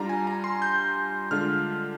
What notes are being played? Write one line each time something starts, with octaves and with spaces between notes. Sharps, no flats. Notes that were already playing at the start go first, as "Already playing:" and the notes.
Already playing: G3 D4 F4 A#5
G#5
A#5
C6
G6
D3 G#3 D4 F4 F6